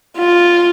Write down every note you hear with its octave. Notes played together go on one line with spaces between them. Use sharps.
F4